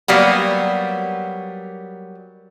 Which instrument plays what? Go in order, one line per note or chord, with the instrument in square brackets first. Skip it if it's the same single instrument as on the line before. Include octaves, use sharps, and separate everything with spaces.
[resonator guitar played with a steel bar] F#3 G3 A#3 B3